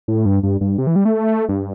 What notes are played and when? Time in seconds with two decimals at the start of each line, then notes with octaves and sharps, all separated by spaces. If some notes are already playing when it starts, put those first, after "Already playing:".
0.08 A2
0.26 G2
0.43 G2
0.61 G2
0.78 C3
0.87 E3
0.96 G3
1.05 A3
1.49 G2